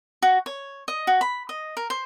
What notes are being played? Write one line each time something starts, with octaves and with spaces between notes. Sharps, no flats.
F#4
C#5
D#5
F#4
B5
D#5
A#4
C5